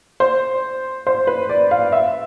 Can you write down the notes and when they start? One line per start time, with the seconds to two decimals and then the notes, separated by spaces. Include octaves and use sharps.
0.20 C5
1.07 C5
1.27 B4
1.49 D5
1.71 F5
1.92 E5